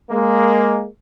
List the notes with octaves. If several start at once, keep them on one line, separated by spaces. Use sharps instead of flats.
G#3 A#3